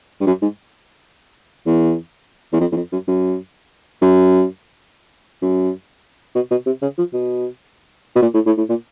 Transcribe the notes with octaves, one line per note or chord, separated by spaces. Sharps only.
G2
F#2
G#2
E2
E2
F2
E2
F2
F#2
F#2
F#2
F#2
B2
B2
C3
C#3
F3
B2
B2
A#2
A2
A2
A2
A#2